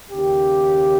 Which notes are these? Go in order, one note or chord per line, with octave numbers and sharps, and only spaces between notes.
D#2 C#3 G4